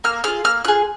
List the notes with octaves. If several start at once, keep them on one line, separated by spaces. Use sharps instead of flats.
A#3 F6
F4 G#4 F6
A#3 F6
F4 G#4 F#6